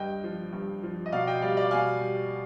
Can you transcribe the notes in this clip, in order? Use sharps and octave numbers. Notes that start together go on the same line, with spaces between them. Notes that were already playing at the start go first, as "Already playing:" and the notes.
Already playing: G2 D#5 G5
F3
G2
F3
D#5
B2 D5 F5
D#5 G5
G3 D5 F5
D5 F5
B2 F5 G#5
G3